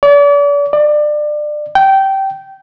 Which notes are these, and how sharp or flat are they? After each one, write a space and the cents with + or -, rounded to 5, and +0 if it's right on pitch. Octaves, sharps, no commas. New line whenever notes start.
D5 -40
D5 +25
G5 -15